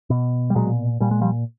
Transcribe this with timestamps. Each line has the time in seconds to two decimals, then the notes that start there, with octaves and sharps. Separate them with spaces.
0.10 B2
0.50 G3
0.55 A#2 F#3 G#3
1.00 A#2 G3
1.11 G#3
1.21 F3 G3